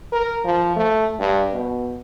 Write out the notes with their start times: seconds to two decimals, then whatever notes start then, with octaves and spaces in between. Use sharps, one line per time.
0.12 A#4
0.44 F3
0.76 A3
1.19 G2
1.53 B2